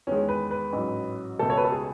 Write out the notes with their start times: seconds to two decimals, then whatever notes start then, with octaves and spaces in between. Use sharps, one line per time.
0.07 E2 D#3 G#3 C#4
0.29 B4
0.51 B4
0.72 A1 G#2 F#3
1.39 C#2 B2 A3 A4
1.50 C#5
1.57 B4
1.64 A4
1.72 G#4